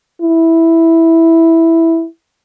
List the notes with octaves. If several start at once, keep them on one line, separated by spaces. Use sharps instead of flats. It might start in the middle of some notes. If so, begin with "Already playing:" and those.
E4